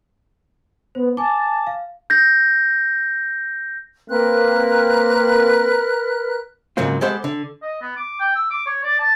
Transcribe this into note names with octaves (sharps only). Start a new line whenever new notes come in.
B3 C5
G#5 A5 D6
F5
G6 A#6
A#3 C4 A#4 B4 F#6
G#2 C#3 F#3 A#3 C4 F4
G#3 B3 G4 A4 C5 F#5
D3
D#5
B3
D6
G5
E6
D6
C#5
D5
A5